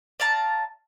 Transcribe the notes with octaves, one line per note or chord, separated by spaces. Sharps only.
D5 F5 A5 A#5